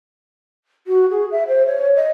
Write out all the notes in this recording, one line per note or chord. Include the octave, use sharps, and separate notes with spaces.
F#4
G#4
E5
C5
C#5
D#5